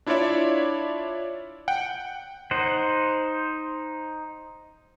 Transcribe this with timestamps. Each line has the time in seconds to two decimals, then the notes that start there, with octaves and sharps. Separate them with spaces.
0.07 D4 E4 F4 C#5 D5 E5
1.68 F#5 G5
2.51 D#4 C5 F#5